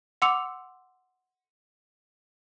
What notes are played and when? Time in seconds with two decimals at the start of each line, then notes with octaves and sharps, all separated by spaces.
0.22 F#5 C6 D6 E6 C#7 F7